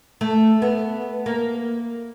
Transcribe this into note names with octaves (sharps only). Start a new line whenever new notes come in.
A3
B3
A#3